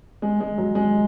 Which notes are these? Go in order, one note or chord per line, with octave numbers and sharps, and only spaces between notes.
G#3
G#3
F#3
G#3